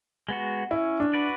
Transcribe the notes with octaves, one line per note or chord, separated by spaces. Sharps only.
G#3 B3 F#4
C#4 E4
D4
F#4 B4 D5